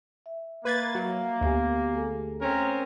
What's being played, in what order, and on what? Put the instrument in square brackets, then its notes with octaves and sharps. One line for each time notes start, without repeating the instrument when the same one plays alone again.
[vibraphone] E5
[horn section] A#3 [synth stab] B4 G#6 A6
[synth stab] F#3
[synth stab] D2 [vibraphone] B3 G4 G#5
[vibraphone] A3 G#4 A4
[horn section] C4 C#4 A#4